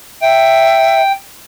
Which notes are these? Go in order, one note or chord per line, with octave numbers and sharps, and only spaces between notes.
E5 G5